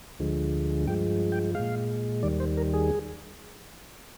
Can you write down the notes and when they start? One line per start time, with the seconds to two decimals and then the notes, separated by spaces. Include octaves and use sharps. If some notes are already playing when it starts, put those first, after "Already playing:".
0.19 D2 D3 F3 G#3
0.87 G2 F3 G#3 G5
1.32 G5
1.55 A#2 G#3 F5
2.23 D#2 D#3 G3 D5
2.40 C5
2.57 A#4
2.74 G#4